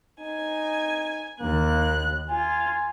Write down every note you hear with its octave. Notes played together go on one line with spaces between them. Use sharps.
D#4 G#5
D#2 A#3 F#6
F4 G#5